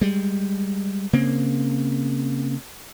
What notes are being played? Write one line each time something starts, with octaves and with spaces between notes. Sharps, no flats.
G3 G#3
C#3 A#3 C4